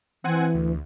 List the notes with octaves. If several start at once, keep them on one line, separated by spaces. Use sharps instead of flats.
E3 C4 F#5 G#5
D2